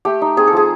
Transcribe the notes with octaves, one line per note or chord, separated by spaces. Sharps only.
A3 G4
D#4
C4 G#4
A4
F3 G#4